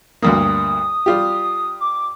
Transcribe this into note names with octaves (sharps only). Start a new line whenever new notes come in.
D2 G2 A#3 D#6
G3 F4 G4
D6